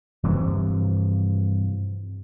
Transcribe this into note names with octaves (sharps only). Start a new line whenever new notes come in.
G2 C3 E3 F3